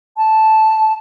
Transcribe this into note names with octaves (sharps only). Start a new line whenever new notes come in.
A5